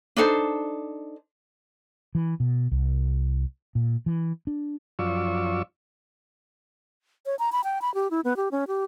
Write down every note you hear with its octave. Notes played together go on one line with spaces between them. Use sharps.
D4 D#4 A4 C5
E3
B2
C2
A#2
E3
D4
F#2 F3 F4 D5 C#6 E6
C#5
A#5
B5
G5
B5
G4
E4
B3
G4
C#4
G4